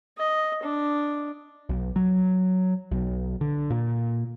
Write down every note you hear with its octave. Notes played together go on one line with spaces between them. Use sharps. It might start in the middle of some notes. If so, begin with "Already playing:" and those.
D#5
D4
B1
F#3
B1
D3
A#2